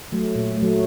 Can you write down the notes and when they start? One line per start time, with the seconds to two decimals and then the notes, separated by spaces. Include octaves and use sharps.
0.12 F#3 A3
0.36 A#2
0.58 F#3 A3